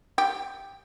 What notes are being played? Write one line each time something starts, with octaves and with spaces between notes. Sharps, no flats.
G4